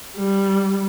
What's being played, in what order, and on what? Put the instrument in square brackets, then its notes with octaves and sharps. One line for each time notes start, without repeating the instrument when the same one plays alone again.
[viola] G3